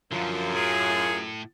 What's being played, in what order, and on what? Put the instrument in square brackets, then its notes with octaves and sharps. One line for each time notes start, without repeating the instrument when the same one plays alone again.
[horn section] F#2 [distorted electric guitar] D3 F3 [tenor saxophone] F4
[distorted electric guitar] A2 [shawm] G#4